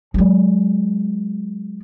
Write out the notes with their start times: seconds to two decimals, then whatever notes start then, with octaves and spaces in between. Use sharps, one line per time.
0.14 F#3 G#3